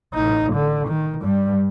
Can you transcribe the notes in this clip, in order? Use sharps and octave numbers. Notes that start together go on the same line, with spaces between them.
A1 D#4
D3
D#3
G2 G3